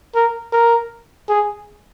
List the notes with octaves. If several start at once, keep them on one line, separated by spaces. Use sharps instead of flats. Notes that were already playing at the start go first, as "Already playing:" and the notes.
A#4
A#4
G#4